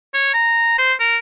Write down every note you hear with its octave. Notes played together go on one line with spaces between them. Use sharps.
C#5
A#5
C5
A#4